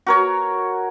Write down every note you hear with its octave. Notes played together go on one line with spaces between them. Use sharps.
F#4 A#4 C#5